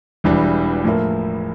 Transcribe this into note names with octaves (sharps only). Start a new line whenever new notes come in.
E1 E2 E3 G3 D4
A2 F3 A#3 E4